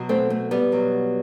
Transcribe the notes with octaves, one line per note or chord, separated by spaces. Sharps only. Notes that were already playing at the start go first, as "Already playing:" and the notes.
Already playing: B2 F#3
A3 C4
A3
G3 B3
B2 F#3